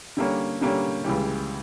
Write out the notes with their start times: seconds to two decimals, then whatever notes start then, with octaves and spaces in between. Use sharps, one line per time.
0.17 D3 G3 A#3 C#4
0.61 D3 G3 A#3 C#4
1.04 C#2 C#3 E3 G3